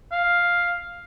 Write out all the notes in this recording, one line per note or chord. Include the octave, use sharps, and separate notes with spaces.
F5